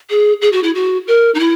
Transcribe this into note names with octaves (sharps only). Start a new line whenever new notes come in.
G#4
G#4
F#4
E4
F#4
A#4
D#4
E4